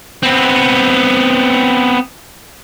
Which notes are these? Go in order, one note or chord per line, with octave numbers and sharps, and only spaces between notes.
B3 C4